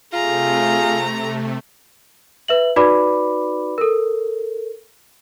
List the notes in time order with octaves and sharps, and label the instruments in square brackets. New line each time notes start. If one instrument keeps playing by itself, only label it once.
[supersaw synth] C3 A3 [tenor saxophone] F4 [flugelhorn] G#4 [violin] A#5
[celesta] B4 E5 F#7
D#4 F#4 B4 D5 B5 D6
A4 A#4